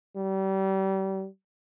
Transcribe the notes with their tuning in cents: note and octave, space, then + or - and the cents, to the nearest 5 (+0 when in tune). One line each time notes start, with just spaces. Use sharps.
G3 -30